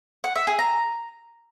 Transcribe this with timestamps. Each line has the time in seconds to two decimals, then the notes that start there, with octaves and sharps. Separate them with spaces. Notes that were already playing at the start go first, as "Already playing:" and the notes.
0.24 F#5
0.36 E5
0.47 G#4
0.59 A#5